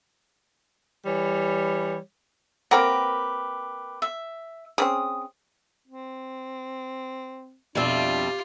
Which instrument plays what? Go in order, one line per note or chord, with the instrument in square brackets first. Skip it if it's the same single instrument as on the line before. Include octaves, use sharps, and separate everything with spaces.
[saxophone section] E3 G3 C#5
[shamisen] A#3 C4 F#5 [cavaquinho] G4 A#4 B4
[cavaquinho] E5
[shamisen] C4 C#4 G#4 [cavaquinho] D#6
[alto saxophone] C4
[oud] F2 B2 E5 [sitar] G3 [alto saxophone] D4 [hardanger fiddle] F4